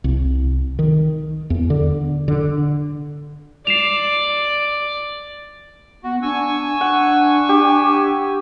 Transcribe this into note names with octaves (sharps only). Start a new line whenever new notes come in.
C2
D#3
E2
D3
D3
D5 C7 E7 F7
B3 F#4
D4 G#5 C#6 E6
D4 F#5
G4